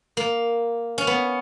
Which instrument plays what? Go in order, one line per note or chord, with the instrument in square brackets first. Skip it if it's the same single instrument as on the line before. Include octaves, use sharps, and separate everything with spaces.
[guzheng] A#3
C#4
B3